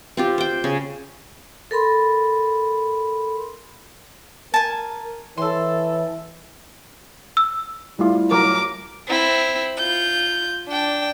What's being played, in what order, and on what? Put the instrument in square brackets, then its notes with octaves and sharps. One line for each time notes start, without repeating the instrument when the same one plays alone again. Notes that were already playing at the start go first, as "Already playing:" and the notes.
[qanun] C4 F4 G4
C5 G5
C#3
[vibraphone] A4 A#4 B5 C6
[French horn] A#4 [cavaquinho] G#5 A5
[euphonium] E3 [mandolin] A4 C6 [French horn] C#5
[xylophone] E6
[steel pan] G3 A3 F4 [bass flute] E4
[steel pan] F#3 A#4 [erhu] D6
[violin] C4 E4
F4 G6
D4 G5